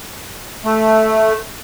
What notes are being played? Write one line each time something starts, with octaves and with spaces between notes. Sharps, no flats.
A3